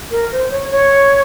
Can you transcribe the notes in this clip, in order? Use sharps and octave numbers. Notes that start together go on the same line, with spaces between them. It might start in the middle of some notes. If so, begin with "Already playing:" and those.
A#4
C5
C#5
C#5